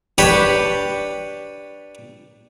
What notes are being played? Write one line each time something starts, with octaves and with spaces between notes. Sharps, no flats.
D4 G4 B4 C#5